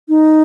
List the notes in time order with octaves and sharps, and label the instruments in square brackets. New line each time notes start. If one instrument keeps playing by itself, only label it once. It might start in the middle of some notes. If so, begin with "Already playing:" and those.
[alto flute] D#4